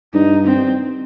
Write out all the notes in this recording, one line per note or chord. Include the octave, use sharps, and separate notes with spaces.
G2 D#4
C4